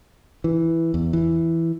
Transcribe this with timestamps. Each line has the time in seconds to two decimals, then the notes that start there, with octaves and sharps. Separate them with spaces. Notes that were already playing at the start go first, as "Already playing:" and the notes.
0.44 E3
0.94 E2
1.13 E3